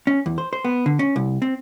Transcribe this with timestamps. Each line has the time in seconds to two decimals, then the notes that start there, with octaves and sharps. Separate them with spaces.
0.07 C#4
0.26 E2
0.38 C5
0.53 C5
0.65 B3
0.86 D3
0.99 C#4
1.16 C2
1.42 C4